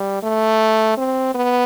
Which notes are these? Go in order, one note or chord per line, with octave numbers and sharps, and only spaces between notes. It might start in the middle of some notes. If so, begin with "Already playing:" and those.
Already playing: G3
A3
C4
B3